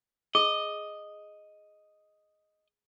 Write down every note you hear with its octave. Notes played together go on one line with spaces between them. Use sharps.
G#4 D#5